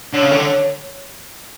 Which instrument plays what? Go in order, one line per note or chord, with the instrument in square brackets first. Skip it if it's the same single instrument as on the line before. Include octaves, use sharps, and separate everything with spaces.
[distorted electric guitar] D3 [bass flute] C#5
[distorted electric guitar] C#3
D3
[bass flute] C#5